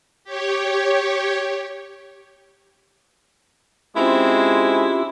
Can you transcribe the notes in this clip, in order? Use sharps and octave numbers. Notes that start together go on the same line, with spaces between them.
G4 C#5
G#3 C4 C#4 E4 F4 G4